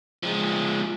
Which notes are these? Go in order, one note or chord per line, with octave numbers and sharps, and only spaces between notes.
F3 G#3